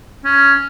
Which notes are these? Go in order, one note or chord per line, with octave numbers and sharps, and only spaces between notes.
C#4